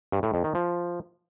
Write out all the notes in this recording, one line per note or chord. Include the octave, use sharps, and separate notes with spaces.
G2
A2
F2
D#3
F3